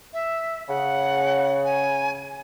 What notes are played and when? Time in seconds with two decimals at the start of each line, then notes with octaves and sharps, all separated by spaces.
0.13 E5
0.68 C#3 F#5
1.65 G#5